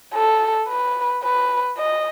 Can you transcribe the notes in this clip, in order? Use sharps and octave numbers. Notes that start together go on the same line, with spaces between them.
A4
B4
B4
D#5